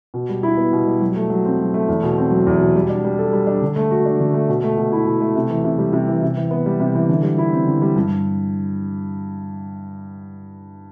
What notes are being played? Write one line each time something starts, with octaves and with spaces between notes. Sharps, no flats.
B2
G3
E4
B3
B2
G3
F#3
A3
F#3
C4
F#3
A3
E2
B2
C4
F#3
E2
B2
G3
D4
G3
A4
G3
D4
D3
A3
F#4
D4
D3
A3
B2
A3
B2
E4
B2
A3
C3
E3
C3
G3
C3
E3
C3
E3
B3
G3
C3
E3
D3
G3
E4
C4
D3
G3
G2